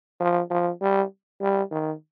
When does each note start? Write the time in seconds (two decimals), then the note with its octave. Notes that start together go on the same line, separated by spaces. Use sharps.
0.20 F3
0.50 F3
0.81 G3
1.41 G3
1.71 D#3